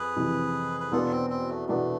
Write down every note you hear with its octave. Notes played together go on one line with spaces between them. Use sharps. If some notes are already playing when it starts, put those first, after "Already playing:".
Already playing: F2 G#4 B4
F2 C3 E3
B4
E2 B2 B3 D4 F4 A4
C4
C4
A3
E2 B2 A3 B3 D4